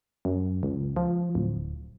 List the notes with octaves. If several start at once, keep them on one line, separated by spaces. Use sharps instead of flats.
F#2
C#2
F3
D1